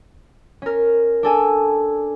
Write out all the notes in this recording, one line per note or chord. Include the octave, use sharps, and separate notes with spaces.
C#4 A#4
D4 A4 G#5